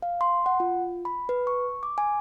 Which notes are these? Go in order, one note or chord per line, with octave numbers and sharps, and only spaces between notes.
F5
C6
F#5
F4
B5
B4
C#6
D6
G#5